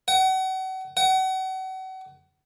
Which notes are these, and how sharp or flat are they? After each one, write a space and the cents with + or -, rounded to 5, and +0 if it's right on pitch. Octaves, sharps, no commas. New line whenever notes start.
F#5 +35
F#5 +35